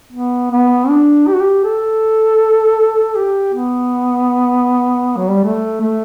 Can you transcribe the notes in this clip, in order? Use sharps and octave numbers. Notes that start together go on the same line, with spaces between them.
B3
B3
D4
G4
F#4
G4
A4
G4
B3
F#3
G3
A3
A3